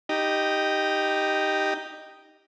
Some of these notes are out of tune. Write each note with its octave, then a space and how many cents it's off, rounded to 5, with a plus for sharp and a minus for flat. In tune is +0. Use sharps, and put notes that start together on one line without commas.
D#4 -5 G4 +0